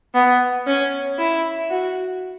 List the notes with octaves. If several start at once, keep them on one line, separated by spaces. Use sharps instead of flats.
B3
C#4
E4
F#4